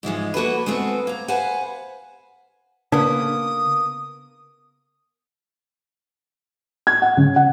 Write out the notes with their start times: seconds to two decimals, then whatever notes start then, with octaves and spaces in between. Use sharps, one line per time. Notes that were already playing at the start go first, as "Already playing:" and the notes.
0.03 G#2 E3 F3 G#3
0.34 A#3 F#4 A4 B4
0.66 G#3 A3 B3 C4 F#4
1.07 A#3 A#5
1.28 B4 C5 F5 F#5 G#5
2.92 C#3 A#3 B3 D4 D#6
6.87 G#6
7.02 F#5
7.17 C#3
7.36 F#5